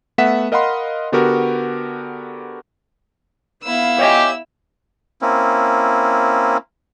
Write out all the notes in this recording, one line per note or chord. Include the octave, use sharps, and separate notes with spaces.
A3 B3 E5 F#5 B6 E7
A#4 D#5 F5 F#5 B5 C6
D3 B3 F#4 G4 A#4
B3 E4 F5 E6
G4 C#5 D#5 G#5
A#3 C4 C#4 E4